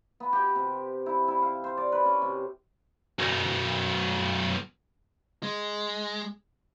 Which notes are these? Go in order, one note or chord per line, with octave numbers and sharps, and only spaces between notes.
B3
G4
C3
E4
E4
F5
C5
D5
B4
C#4
C3
B1 F#2
G#3